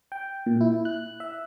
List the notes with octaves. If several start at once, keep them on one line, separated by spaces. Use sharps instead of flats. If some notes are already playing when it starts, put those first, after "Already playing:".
G5
A#2
E4
F#6
E5